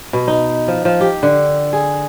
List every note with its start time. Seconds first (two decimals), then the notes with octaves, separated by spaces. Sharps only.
0.13 B2
0.28 D#4
0.68 F3
0.85 F3
1.01 G4
1.23 D3
1.73 G#4